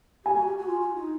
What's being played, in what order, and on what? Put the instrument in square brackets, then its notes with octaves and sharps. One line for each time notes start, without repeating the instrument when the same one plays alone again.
[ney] G4 [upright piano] G#5
[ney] F#4
G4
F#4
F4
F4
D#4